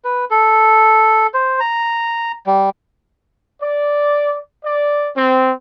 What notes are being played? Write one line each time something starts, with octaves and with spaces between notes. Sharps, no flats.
B4
A4
C5
A#5
G3
D5
D5
C4